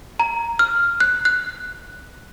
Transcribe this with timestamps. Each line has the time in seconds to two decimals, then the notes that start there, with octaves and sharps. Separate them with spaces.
0.20 A#5
0.59 F6
1.00 F#6
1.25 F#6